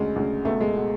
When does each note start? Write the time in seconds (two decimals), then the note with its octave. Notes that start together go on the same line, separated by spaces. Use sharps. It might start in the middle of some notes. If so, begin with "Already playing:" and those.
Already playing: D2 C#3 G#3
0.16 D2 C#3
0.45 C#2 B2 A3
0.61 G#3
0.76 B2